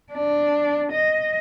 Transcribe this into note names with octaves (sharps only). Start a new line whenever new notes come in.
D4
D#5